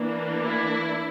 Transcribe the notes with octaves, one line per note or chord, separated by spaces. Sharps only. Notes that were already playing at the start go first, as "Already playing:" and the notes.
Already playing: E3 A#3 D4
E4